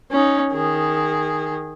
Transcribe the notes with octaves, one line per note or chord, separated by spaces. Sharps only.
C#4 D#4
D#3 G#4